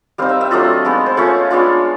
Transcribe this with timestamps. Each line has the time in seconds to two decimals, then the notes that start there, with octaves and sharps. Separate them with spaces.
0.18 G3 C4 D#4 F5
0.29 E5
0.41 E5
0.51 F#3 A3 D4 F4 D#5
0.85 G#3 B3 D#4
1.06 C5
1.17 A3 C#4 F4 C#5
1.51 G#3 B3 D4 F4